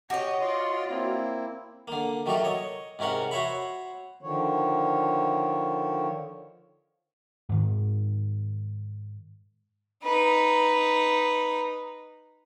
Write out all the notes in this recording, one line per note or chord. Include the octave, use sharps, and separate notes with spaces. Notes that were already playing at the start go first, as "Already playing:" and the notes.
F#4 G4 C#5 D#5
F4 D5 D#5 C6
A#3 C4 E4
D3 A#3
D#3 F#3 A3 G4 A4 A#4
C#5 D#5
G#2 C3 C#4 A#4 F#5
F#4 C5 C#5 E5 B5
D3 D#3 F3 C#5
G#2 D#3
D#4 B4